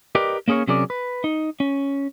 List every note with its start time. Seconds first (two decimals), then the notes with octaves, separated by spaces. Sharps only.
0.15 G4 A#4 B4 D5 D#5 G5
0.48 A#3 C#4 G#4 A#4 C#5
0.67 C3 F#3 C#4 G#4 A#4 D5
0.90 B4
1.24 D#4
1.60 C#4